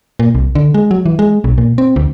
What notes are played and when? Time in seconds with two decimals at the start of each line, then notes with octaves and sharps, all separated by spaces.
0.19 A#2
0.35 C2
0.55 D3
0.74 G#3
0.91 F#3
1.06 E3
1.19 G#3
1.44 B1
1.58 A#2
1.78 C4
1.96 D2